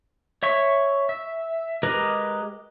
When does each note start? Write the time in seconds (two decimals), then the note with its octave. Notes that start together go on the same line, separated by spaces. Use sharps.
0.43 C#5 E5 C#6
1.09 E5
1.83 G#3 G4 A#4 B4 D#5